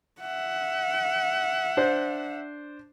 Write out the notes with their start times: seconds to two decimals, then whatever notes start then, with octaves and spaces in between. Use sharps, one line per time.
0.20 E5 F#5
1.77 D4 C5